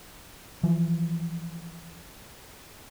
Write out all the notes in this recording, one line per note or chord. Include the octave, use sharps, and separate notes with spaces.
E3 F3